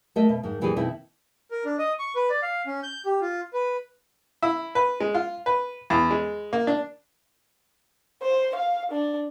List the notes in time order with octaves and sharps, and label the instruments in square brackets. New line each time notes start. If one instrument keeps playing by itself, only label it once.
[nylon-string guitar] A3 A#4 D#5 E5
B2
G#2 D#3
A#2 E3 D4 E4 G4 G#4
B2 D#3 C4 E4
[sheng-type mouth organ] A#4
D4
D#5
C#6
B4
D5
F5
C#4
G6
G4
F4
B4
[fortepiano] E4
B4
G#3
F4
B4
E2
G#3
A#3
D4
[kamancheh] C5
F5
D4